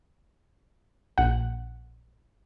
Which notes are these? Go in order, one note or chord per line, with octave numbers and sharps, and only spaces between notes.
A#1 F#5